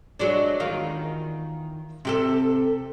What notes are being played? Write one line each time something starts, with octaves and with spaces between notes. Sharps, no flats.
F#3 G#3 D4
E2 D#3 F4
C3 G4 A4